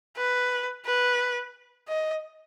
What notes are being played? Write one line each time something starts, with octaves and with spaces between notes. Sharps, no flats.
B4
B4
D#5